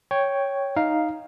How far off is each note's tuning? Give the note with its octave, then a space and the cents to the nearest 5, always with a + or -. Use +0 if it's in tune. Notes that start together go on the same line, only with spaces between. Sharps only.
C#5 +0 G5 +0
D#4 +0 F5 +0